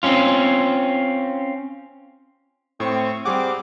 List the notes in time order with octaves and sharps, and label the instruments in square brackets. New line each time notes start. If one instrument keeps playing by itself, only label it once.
[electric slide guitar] C4 C#4 F4
[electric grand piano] A2 [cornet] C4 [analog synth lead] C#6
[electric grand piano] G3 G#4 F#5 [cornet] C4 [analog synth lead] D6